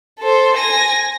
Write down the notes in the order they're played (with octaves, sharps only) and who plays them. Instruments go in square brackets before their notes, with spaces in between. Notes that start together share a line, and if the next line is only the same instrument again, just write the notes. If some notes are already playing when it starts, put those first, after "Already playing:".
[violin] A4 C5
G#5 A#6